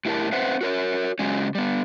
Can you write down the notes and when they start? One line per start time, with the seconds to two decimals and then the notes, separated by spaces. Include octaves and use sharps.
0.05 A2 E4 G4 A#4 A5
0.32 C4 B4 C5 E5 F#5
0.61 F#4 A#4 C#5
1.19 C#3 F#3 G#3 C#4
1.55 G3 B3